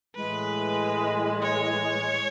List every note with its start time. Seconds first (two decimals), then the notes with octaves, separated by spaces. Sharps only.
0.15 A2 E3 G#3 B4
1.42 C#5